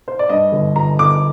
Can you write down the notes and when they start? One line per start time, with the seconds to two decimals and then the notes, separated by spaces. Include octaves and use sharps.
0.08 C5
0.19 D5
0.29 G2 D#5
0.52 G1
0.76 G1 A#5
0.99 G1 D6